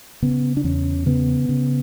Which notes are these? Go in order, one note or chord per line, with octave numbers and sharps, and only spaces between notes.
C#3 B3
D4
E2 C#4
C#3 B3
C#3